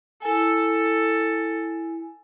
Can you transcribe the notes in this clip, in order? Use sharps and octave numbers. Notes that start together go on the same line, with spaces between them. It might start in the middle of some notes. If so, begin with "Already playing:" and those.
E4 A4 G#5